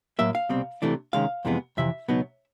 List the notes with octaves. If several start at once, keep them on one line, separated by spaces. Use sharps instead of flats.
A2 F#3 A#3 E5
F5
C2 B2 G3 C4
C3 E3 A3 D4
C3 D#3 G#3 C#4 F5
F2 C3 E3 G#3 B3
F2 C3 E3 E5
C#2 B2 F#3 B3 D#4